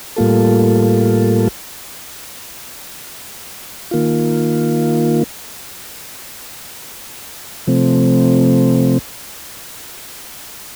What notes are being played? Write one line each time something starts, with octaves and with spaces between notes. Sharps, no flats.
A2 G3 A#3 F4 A4
D#3 A#3 F4
C3 F3 A3 C4